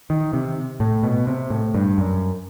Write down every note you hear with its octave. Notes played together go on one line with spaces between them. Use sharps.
D#3
C3
A2
B2
C3
A2
G2
F#2